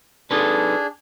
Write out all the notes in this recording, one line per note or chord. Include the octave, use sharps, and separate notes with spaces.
D4 D#4 G#4 A4 B4